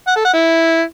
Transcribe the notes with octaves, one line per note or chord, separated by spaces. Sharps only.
F#5
A4
F#5
E4